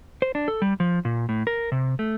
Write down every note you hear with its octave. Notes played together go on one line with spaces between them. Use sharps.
C5
D4
A4
G3
F3
A#2
A2
A#4
C3
A3